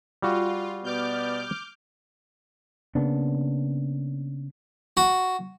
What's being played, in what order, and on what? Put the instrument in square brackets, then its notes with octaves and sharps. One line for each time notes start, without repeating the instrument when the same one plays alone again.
[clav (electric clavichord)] G3 F#4 [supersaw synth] F4
[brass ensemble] B2 B3 D5 [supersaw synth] D6 F6 G6
[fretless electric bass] C#3 A#3 B3 D4
[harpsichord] F#4